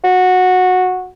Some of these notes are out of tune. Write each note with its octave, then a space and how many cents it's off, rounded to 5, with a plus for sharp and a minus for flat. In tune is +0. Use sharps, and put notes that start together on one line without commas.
F#4 -10